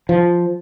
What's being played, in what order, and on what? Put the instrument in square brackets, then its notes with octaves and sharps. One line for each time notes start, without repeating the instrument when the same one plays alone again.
[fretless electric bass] F3